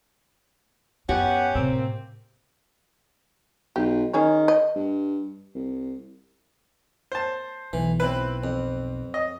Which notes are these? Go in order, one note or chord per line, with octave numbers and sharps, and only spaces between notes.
F#2 B3 C#4 G4 F#5
A2 C3 A#3 C4
B1 G4
D#3 C#4 G#4 C#5
D#5
G2
C2
C5 A5
B1 E3
C4 E4 B4
F2
D#5